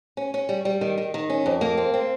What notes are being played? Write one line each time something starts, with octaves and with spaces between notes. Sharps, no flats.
C#4
C#4
G3
G3
D#3
D#3
D#3
C#4
F2
A#3
C4
C4